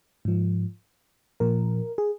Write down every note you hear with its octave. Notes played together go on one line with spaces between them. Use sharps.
G#2 F3
A#2 F3 A#4
G#4